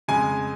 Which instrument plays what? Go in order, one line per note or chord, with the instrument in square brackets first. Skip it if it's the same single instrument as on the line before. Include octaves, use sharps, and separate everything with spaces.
[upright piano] F2 C#3 G#3 G#5